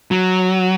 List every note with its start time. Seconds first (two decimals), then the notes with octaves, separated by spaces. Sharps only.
0.11 F#3